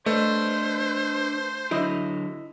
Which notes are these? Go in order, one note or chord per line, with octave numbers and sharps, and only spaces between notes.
A3 D4 B4 C5 D#5
D3 F#3 E4 D#5